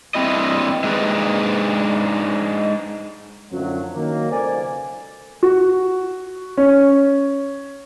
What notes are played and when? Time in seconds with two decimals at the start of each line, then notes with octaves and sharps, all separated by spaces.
0.14 G2 C4 E4 D#5
0.84 G#3 D4 D#4 G#4 B4
3.51 F#2 A2 D3 F3 F#3
3.95 D#3 F#3 A#3
4.31 C#2 B2 A4 C5 D5 G#5
5.43 F#4
6.57 C#4